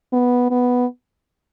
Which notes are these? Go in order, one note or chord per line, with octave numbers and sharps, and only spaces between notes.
B3
B3